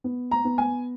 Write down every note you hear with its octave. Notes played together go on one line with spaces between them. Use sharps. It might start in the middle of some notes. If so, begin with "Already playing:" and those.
B3
A#5
B3
G#5